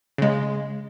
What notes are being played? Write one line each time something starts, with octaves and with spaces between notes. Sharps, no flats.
C#3 G#3